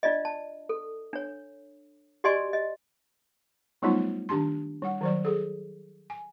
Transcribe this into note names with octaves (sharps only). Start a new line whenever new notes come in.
D4 F4 D5 D#5
A5
A4
D4 C#5
F#4 G4 D5 D#5 G#5 C6
D#5
F#3 G3 A3 B3 D#4 F4
D#3 D4 G4 A5 C6
G3 F#5
D#3 F#3 D5
G#4 A4
G#5